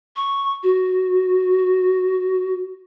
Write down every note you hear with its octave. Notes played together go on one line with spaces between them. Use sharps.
C#6
F#4